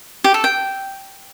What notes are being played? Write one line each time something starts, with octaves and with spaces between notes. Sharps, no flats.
G4
A4
G5